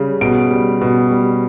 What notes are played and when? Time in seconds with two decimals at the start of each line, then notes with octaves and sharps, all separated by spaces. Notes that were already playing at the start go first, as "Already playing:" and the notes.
Already playing: C#3 G3
0.21 B2 D7
0.51 G3
0.81 B2
1.11 G3